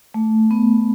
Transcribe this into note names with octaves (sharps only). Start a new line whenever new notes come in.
A3
B3